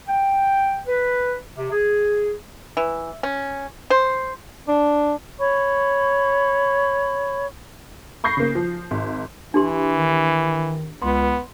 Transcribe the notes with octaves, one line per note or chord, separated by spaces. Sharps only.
G5
B4
C3
G#4
E3
C#4
C5
D4
C#5 B5 C#6
B5 C#6 G6 A#6 C7
C#3 A#3
F3
G#1
E3 D4 G4 C6
D#3
C#2 B3 C6